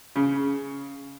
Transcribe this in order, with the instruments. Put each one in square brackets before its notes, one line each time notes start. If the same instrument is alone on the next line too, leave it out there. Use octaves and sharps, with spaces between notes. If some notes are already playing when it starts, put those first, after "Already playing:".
[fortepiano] C#3